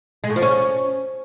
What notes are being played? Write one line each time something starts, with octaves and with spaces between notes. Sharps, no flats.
G#3
A2
F3
C#4